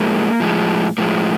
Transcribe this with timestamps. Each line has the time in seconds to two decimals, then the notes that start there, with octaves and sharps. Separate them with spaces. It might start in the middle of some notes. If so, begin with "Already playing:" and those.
Already playing: A2 F3 G#3 A#3
0.40 A2 F3 G#3
0.98 A2 F3 G#3 A#3